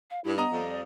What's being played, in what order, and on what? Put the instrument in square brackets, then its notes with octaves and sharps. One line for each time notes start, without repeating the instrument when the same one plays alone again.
[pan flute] F5
[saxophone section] G2 [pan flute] E4
[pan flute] B3 [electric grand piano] D#5 A#5 D#6
[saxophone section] F2 G3
[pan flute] D5